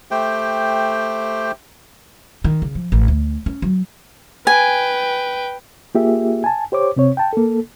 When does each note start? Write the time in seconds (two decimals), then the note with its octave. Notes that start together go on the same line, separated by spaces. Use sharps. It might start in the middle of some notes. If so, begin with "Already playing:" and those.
0.11 A3 G4 C5 G5
2.44 D#3
2.62 C#3
2.75 F3
2.92 A1
3.08 D2
3.46 C#4
3.62 F#3
4.47 B4 G5 G#5
5.95 A#3 F4 G4 G#4 E5
6.44 G#5 A5
6.72 G4 C5 C#5 D6
6.96 C3 C4 C#5
7.17 G5 A5
7.33 A#3 A4